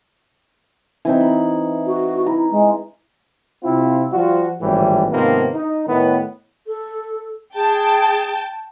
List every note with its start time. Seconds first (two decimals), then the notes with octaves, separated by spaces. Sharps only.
1.05 E3 C4 D#4
1.21 B5
1.86 F#4
2.26 E4 A#5
2.51 G#3
3.64 C3 C4 E4 F4
4.12 F3 G3 F4 F#4
4.61 G#1 A2 E3 G3
5.11 G#2 C3 D#3 F3 A#3 B3
5.54 D#4
5.87 A2 D#3 B3
6.67 A4
7.55 G#4 G5 A5